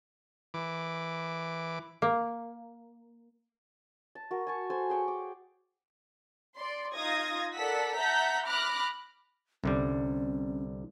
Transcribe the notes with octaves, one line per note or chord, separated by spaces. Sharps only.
E3 D6
A#3
A5
F#4 A#4
G#5 A5 C#6
A4 C5 G#5
G#4 G5 C#6
D6
D5 C6
D#4 F4 D#6 G#6 A#6
A4 A#4 D5 F#5 E6 B6
E5 F#5 A5 A#5 G6 B6
B5 D6 F6 F#6 A#6
C2 D3 G3 C#4